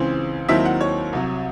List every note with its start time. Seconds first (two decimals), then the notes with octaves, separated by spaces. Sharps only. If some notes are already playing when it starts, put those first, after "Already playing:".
Already playing: C#2 C#3 E3 C4
0.48 D#2 D#3 F#3 C4 E4 E5
0.65 F#5
0.81 C#5
1.13 C2 C3 F#3